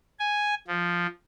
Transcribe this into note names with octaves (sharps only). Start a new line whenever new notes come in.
G#5
F3